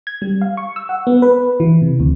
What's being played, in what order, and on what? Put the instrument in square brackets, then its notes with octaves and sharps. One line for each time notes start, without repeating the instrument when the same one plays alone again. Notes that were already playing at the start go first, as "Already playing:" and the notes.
[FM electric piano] G#6
G3
F5
C#6
E6
F#5
B3
B4
E3
C3
D2